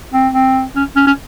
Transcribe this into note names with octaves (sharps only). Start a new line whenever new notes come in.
C4
C4
C#4
C#4
C#4